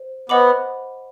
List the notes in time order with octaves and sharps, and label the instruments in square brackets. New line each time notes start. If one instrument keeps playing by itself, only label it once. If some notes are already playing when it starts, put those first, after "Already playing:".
Already playing: [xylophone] C5
[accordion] B3 [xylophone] C5 D#5 F#5 B5 D6